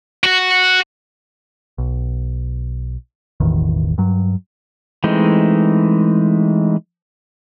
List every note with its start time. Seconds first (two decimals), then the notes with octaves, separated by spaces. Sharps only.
0.24 F#4
1.78 B1
3.40 E1 A1 E2 D#3
3.98 G2 F#3
5.04 E3 G#3 A3 C4 D#4